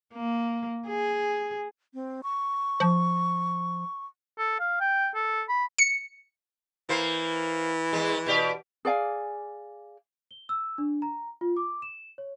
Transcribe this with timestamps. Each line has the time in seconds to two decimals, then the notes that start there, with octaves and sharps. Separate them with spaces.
0.14 A#3
0.88 G#4
1.94 C4
2.23 C#6
2.80 F3
4.38 A4
4.60 F5
4.80 G5
5.15 A4
5.49 B5
5.78 C#7
6.89 E3 A#3 C5
7.93 E2 G#3
8.27 B2 G4 D5
8.85 G#4 D5 F5 G#5
10.31 G7
10.49 E6
10.78 D4
11.02 A#5
11.41 F4
11.57 D6
11.82 E7
12.18 C#5